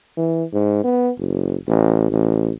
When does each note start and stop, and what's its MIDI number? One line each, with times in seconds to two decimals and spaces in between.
0.17 0.44 52
0.54 0.83 44
0.84 1.11 59
1.18 1.56 30
1.68 2.07 33
2.11 2.51 33